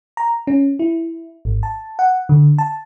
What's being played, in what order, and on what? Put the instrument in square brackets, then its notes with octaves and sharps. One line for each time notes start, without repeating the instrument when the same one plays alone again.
[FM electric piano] A#5
C#4
E4
G#1
A5
F#5
D3
A5